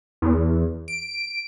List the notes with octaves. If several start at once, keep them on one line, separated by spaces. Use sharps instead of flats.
E2
D7